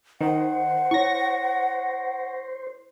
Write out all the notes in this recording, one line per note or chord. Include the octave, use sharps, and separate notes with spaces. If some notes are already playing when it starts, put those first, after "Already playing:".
D#3 C5 F#5
E4 C#5 C#6 A#6